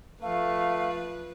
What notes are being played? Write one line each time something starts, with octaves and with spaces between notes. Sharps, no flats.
F3 A3 B4 F5